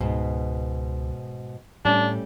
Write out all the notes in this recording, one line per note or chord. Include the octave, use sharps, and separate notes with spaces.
C#2 G#2 B2
A2 G3 A3 C#4 D4